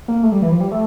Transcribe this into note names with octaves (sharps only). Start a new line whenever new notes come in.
A#3
A3
G3
E3
F3
G3
A3